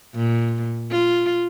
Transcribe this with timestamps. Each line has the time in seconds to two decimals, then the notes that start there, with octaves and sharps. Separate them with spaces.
0.14 A#2
0.91 F4